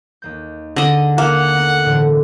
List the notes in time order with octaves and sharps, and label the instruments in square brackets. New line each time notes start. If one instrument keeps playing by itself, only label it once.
[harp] D#2 A#3 G6
[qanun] D3 D#5 [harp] G#4 A#6
[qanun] A#3 [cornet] F#5
[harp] A3 B3 A#4
E1 A2 D3